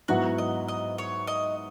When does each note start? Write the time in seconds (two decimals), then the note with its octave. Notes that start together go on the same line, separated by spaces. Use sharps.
0.08 G#2 F#3 B3 E4 F#4
0.38 D#5
0.68 D#5
0.98 C#5
1.27 D#5